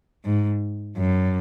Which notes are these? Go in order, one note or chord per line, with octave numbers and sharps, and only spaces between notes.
G#2
F#2